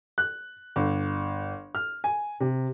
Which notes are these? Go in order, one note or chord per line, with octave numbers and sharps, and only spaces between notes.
F#6
G1
F6
G#5
C3